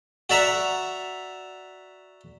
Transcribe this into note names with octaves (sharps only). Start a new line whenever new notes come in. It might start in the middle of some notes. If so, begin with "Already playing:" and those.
F#4 D5 E5 A#5